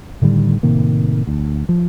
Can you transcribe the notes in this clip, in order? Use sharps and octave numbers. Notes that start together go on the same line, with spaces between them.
A2 D3 D#3 G3
A2 C3 D#3 A#3
D2
F3